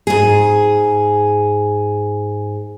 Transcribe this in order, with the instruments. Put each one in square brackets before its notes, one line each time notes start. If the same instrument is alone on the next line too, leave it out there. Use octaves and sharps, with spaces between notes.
[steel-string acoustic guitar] G#2 G#4